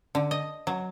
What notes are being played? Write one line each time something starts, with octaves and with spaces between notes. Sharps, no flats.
D3
D#5
F#3